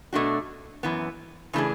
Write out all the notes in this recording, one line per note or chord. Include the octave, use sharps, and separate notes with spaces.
B2 A3 D4 F#4
F#2 E3 B3
C#3 E3 A3 D4 G#4